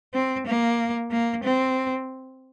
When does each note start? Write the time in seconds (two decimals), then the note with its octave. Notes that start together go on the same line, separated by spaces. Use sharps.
0.14 C4
0.46 A#3
1.11 A#3
1.44 C4